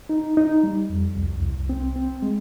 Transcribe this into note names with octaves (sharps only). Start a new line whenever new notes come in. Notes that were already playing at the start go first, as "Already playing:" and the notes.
D#4
D#4
G3
F2
C2
C2
C4
C4
G#3